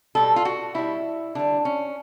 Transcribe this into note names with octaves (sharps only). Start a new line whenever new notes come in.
B2 G3 A4
F4
F#4
B2 G3 E4
D3 G3 D4
C#4